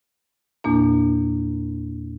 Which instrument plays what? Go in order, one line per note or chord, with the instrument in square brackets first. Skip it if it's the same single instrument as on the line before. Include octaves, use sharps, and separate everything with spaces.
[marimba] E2 A#2 A#3 D4